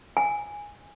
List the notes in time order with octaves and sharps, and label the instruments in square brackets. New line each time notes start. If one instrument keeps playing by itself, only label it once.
[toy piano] G#5